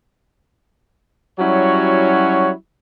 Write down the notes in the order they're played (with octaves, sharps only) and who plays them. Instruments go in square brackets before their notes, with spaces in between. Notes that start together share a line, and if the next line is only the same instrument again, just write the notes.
[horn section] F#3 G3 C#4 E4 F#4 C#5